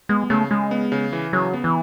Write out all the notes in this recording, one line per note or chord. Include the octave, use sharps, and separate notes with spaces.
G#3 B3
C#3 A3
C#3 G#3
B3
C#3
E3
C#3 F#3
B3
E3